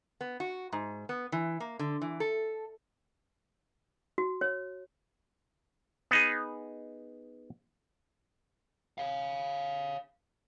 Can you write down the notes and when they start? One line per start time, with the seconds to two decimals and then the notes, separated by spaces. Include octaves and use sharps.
0.21 B3
0.40 F#4
0.72 G#2
1.09 B3
1.32 E3
1.60 A#3
1.79 D3
2.02 E3
2.20 A4
4.18 F#4
4.41 C#5
6.11 B3 D#4 G#4
8.98 C#5 F5